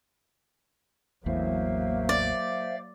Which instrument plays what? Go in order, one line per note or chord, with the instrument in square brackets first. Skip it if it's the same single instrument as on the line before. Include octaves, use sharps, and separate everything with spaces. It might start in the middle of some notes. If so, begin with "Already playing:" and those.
[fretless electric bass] A1 E2 A2 [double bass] F#3 A#3 [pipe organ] C5 E5 F5
[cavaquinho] D5